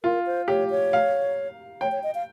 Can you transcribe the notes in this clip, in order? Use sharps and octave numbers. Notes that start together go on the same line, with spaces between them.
F4 A#4
C5
G4 C#5
C#5
F5
C#5 G5
C#5
D#5
F5